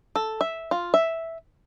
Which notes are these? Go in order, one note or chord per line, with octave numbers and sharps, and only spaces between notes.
A4
E5
F4
E5